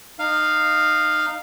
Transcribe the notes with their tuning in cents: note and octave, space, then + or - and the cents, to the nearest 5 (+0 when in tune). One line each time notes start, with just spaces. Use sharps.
D#4 -20 F5 +0